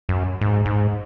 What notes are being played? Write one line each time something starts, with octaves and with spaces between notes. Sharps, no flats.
F#2
G#2
G#2